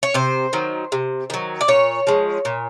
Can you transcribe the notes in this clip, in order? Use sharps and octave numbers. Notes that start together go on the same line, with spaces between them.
C#5
C3 C5
D#3 F#3
C3
D#3 F#3
D5
A#2 C#5
F3 G#3
A#2